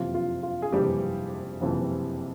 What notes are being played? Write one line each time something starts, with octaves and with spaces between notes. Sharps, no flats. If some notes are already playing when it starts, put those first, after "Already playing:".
Already playing: F#1 F2 C3 E3 F4
F4
F4
G#4
F#1 F2 C3 E3 G3 G4
F#1 F2 C3 E3